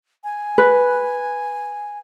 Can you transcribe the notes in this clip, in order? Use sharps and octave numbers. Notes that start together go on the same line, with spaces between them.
G#5
B4